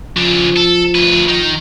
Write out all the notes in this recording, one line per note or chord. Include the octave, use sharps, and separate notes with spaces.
C#3 F3 D4
A4
D2 B4
D#3 D#4